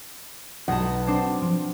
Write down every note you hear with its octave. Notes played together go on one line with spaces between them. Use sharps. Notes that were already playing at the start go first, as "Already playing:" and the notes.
B1 F#5 A5
C4 D4 C5
F3